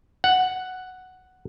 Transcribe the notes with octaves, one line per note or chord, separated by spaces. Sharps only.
F#5